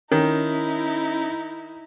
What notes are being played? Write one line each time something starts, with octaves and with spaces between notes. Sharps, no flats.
D#3 C#4 D#4 E4